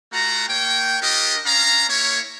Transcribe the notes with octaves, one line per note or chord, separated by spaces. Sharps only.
A3 F4 F#4 F#5 A#5
A#3 C#5 G5
D4 F4 G4 A#4 D#5
C#4 D4 F5 A#5
A#3 E4 C#5